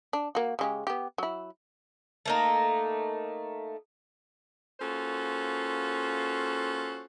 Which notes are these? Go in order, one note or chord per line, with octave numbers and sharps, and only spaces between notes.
D4
A#3 F#4
C#3 G#3 G4
B3 G4
F#3 E4
A3 A#3 D#4
A#3 C#4 F4 F#4 A4 C5